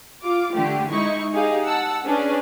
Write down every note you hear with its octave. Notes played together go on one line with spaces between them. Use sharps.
F4 D6
D3 A3 G4
G#3 D#4 E4 C#6
D#4 G4 G#4 F5
F#5 A5 E6
C#4 D4 G#4 B4